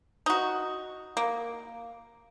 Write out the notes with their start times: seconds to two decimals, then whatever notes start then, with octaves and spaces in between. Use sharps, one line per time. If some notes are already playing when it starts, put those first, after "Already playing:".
0.26 D#4 F#4
1.17 A#3